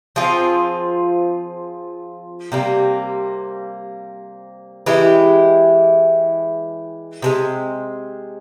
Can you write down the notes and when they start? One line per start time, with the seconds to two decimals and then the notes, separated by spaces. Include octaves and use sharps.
0.16 F3 C4 F4 G#4
2.52 C3 G3 A#3
4.86 E3 G#3 E4 G4
7.22 C3 E3 G#3